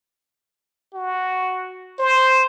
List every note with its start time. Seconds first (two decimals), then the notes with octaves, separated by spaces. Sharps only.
0.94 F#4
1.99 C5